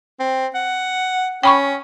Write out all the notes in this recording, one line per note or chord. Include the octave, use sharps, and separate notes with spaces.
C4
F#5
C#4 G5 B5 C#6